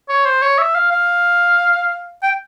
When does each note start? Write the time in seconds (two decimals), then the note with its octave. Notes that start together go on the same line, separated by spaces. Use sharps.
0.09 C#5
0.25 C5
0.42 C#5
0.58 E5
0.75 F5
0.91 F5
2.23 G5